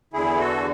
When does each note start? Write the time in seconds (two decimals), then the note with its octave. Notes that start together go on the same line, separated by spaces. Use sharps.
0.13 E2 D3 E4 G#4
0.39 F#4 A4